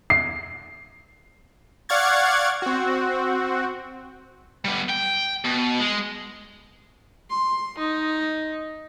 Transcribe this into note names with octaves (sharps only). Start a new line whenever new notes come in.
C7
D5 F5 F#5 C#6 G#6 A6
C4 F#4
G3 B3
G5
B2
G#3
C6
D#4